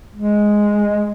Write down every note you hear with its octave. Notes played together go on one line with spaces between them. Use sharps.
G#3